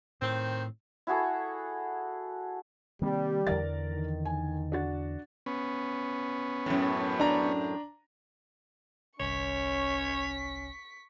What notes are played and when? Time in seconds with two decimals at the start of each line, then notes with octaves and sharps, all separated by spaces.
0.22 A2 D#3 C4
1.07 E4 F#4 G#4 A4
3.02 C3 D#3 G3 A#3
3.47 E2 D3 E3 A#4 D5 A6
3.92 D#3
4.25 G#5
4.72 D4 F#4 A6
5.46 B3 C#4
6.66 F#2 A2
7.20 D4 A#5
9.20 G1 C2 C#4 C#5 C#6 B6